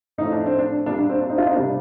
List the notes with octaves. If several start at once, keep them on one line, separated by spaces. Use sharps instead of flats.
A2 F3 A3 D#4
D4
C4
D4
A#2 G3 A#3 D4
D4
C4
D4
C4 D#4
D4 F4
C4 D#4
C3 G3 A#3 D4